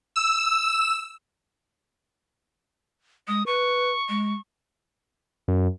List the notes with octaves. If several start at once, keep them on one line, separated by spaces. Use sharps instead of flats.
E6
G#3 D#6
B4 C#6
G#3
F#2